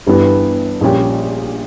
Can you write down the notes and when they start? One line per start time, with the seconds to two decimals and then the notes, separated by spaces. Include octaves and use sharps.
0.07 G1 G2 E3 G3 B3
0.81 A#1 A#2 G3 C#4 G4